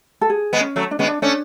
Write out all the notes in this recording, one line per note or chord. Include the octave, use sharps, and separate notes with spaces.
A4
G#4
G#3 B3
C#4
F#3 A3
D4
G#3 B3 C#4
D4
A3 C#4 D4